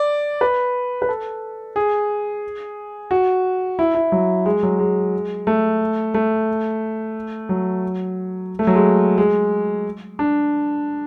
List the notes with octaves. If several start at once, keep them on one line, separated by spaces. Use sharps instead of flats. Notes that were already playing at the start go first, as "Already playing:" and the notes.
Already playing: D5
B4
B4
A4
G#4
F#4
E4
E4
F#3
G#3
F#3
G#3
A3
A3
F#3
A3
F#3
G#3
G#3
D4